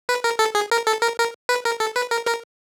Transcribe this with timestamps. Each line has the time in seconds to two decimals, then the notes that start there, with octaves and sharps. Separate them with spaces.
0.09 B4
0.24 A#4
0.39 A4
0.55 G#4
0.71 A#4
0.87 A4
1.02 A#4
1.18 A#4
1.49 B4
1.65 A#4
1.80 A4
1.96 B4
2.11 A#4
2.27 A#4